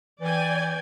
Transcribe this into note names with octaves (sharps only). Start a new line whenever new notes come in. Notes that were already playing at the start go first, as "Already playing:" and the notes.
E3 D5 G5 G#5